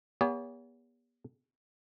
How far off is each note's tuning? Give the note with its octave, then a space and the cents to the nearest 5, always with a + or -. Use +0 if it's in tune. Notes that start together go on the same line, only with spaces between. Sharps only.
B3 -35 G4 +45 C#5 +40